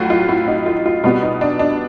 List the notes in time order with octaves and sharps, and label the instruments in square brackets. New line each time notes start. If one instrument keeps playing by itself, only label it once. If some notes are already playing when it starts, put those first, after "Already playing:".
Already playing: [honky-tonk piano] A2 F#3 F4 F#4
F4
E4
D#4
F4
F4
B2 G3 B3 F4
D#4
D4
D4